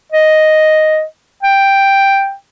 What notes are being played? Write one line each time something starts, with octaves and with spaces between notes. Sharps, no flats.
D#5
G5